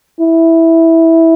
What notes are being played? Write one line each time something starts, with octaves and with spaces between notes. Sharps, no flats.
E4